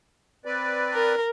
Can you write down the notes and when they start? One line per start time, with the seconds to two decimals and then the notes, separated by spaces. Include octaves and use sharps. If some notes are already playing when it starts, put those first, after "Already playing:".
0.45 C4 B4 D5
0.95 A#4